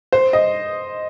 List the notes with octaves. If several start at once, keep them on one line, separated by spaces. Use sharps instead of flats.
C5
D#5